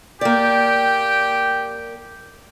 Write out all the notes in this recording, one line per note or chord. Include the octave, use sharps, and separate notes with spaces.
A#3 G4 D5 G5